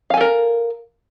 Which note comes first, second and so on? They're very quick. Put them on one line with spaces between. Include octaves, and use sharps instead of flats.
F5 G#5 A4 A#4